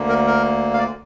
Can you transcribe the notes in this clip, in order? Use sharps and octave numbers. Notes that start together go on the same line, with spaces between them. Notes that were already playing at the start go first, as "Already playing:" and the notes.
Already playing: D2 D3 A#3
A#4
A#4
F5
D5